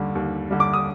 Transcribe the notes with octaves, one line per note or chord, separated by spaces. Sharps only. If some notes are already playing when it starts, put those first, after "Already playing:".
Already playing: D#2 D3 G3
D#2
D3 G3
D6
D#6